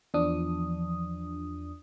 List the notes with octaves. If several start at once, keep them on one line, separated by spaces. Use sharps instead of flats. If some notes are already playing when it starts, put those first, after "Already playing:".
E2 F3 D4 D#6